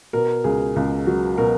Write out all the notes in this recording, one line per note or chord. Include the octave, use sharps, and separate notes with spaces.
B2 A#4
C#2 G#4
C#2
F#3
B2 A#4